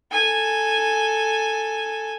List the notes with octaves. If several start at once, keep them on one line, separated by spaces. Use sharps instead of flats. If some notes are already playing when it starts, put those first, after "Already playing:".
A4 G#5